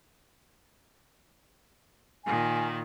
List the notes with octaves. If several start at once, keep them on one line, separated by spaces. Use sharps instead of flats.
A#2 D#3 G#5